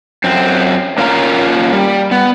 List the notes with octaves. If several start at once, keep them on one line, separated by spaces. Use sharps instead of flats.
F#2 C4
A#3 C#4 F4 F5 G#5 A#5
G3
B3